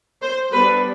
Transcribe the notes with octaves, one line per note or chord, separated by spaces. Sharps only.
C5
G3 B3 D4 B4